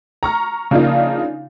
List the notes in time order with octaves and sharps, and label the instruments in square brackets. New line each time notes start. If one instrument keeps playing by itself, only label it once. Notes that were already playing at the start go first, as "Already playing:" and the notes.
[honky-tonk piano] A#5 C#6 F6
C#3 F3 A#3 D4 D#4 F4